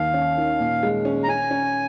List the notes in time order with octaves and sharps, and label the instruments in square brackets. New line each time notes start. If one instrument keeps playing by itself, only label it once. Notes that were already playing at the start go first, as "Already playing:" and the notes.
Already playing: [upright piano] D#2 [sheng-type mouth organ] F5
[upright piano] C#4
D#3
A#2
G#3
C#4
[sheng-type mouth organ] A#5
[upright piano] C#4 [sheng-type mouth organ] G#5
[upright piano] C#4